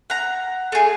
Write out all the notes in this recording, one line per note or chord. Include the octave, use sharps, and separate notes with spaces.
F#5 A#5
A3 G#4